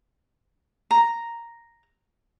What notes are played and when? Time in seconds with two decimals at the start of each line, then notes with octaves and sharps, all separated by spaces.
0.91 A#5